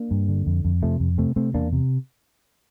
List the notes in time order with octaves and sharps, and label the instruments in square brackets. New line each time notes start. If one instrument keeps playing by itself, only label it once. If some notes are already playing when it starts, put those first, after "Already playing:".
Already playing: [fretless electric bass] A#3 D4
G2
D3
F2
F2
C3 F3 A3
F2
C3 A3 C4
C3 A3 C4
E2 A#3 D4
C3